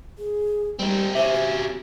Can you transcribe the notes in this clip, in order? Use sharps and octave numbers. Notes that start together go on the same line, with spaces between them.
G#4
G3 C4 D#4 G4
C3 C#4 G4 C5 E5
F#4
E7